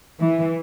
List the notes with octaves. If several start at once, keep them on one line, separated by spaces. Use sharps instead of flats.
E3